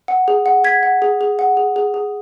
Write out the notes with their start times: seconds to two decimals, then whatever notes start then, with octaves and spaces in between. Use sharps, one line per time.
0.08 F#5
0.28 G#4
0.46 F#5
0.64 F#5 G#6 B6
0.83 F#5
1.02 G#4
1.21 G#4
1.39 F#5
1.57 G#4
1.76 G#4
1.94 G#4